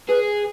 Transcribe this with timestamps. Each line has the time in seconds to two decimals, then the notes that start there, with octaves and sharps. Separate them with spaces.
0.09 G#4 B4